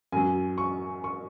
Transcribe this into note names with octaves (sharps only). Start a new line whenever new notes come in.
F#2 F#3 G#5
C#6
C#6